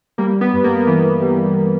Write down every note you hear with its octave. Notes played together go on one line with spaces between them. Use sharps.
G3 A#3
B3
G2
A#3
E3 B3
G3